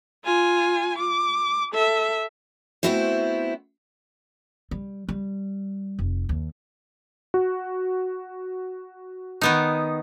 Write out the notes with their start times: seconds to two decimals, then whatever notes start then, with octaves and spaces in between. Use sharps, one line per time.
0.24 F4 G#5
0.98 D6
1.74 A4 E5
2.83 A3 B3 C4 E4 F#4 C5
4.71 G3
5.09 G3
5.99 F1
6.29 D#2
7.34 F#4
9.41 D#3 B3 D#4